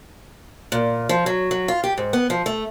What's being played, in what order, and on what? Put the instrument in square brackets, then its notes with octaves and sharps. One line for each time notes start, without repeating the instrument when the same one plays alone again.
[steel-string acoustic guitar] A#2
F3
F#3
F#3
F4
G4
G#2
B3
F3
A3